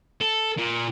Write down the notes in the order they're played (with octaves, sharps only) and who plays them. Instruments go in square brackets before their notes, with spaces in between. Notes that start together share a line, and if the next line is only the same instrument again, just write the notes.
[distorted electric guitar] A4
A#2